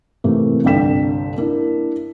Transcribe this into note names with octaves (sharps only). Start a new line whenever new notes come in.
C3 E3 A3 A#3
G1 C2 D4 G5 B6 E7
A#3 D4 E4 A#4